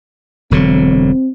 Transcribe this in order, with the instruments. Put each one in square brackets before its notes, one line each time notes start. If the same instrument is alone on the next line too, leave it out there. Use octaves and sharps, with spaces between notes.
[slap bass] E1 D3 F#3 [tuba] C4